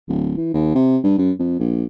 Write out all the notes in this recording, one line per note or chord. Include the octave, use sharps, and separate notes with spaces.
D1
E3
D#2
C3
G2
F#2
F2
A#1